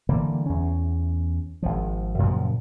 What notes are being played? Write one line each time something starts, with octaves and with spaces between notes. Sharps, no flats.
D3 E3 G3 A#3
E2 C#4
G#1 F3
F#2 A#2 C#3 F3